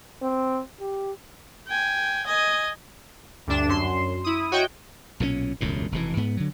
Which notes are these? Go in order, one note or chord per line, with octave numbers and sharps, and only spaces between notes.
C4
G4
G5 G#5
D#5 G#5
D2 G2 D4 E7
F#2 C6
E4 D#6
F#4 C#5 D#5 G5
B1 A#2 D3 C#4
E1 C#2 F#2 A2
F1 B2 E3
G#2 B3
D3 F#3